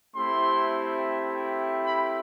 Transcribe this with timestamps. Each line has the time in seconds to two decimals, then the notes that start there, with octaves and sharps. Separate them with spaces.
0.15 A3 C4 E4 G4 C6
1.84 B5